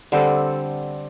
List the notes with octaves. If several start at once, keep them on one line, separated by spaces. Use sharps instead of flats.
D3 G3 C4 A4